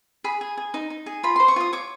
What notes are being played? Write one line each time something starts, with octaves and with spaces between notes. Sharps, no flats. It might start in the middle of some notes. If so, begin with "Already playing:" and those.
G#4 B5
G#4
G#4
D#4
D#4
G#4
F4 B5
C5 C6
C#6
F4 D#6
C#5 D6